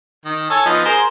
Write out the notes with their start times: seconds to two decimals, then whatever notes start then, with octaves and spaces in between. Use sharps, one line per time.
0.25 D#3
0.50 A4 C#5 G#5
0.65 F3 B3 D#4
0.85 G#4 A#4 C5